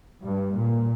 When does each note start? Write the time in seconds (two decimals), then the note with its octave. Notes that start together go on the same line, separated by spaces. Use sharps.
0.24 G2
0.54 A#2